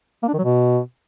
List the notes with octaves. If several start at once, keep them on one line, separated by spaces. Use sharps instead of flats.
A#3
D4
D#3
F#3
B2